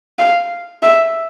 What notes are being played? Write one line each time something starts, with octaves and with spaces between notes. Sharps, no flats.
F5
E5